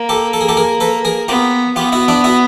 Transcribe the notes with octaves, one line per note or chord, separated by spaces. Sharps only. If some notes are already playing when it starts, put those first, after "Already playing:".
Already playing: A#3
G4 A4
A4
G#4
G4 A4
G#4 A#4
A4 B4
G#4 A#4
B3 F4 G4
B3 F4 G4
E4 F#4
D4 E4
E4 F#4